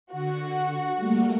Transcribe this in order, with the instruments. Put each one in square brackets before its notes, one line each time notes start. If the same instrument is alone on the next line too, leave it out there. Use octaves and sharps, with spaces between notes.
[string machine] D3 [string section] F#4
[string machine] G3 A3 A#3